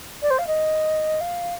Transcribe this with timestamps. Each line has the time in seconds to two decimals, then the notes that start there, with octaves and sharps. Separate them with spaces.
0.22 D5
0.30 C5
0.38 F5
0.46 D#5
1.20 F5